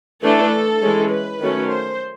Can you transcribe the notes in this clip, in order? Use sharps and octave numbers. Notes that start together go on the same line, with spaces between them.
E3 A3 D4 A4
E3 G#3 C#4
B4
D#3 F#3 A3 C#4
C5